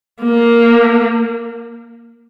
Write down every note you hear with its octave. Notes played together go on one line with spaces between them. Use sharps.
A#3